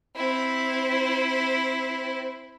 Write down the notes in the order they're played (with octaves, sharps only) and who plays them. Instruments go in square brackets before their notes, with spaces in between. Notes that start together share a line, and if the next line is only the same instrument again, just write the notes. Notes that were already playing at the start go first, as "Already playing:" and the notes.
[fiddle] C4 E4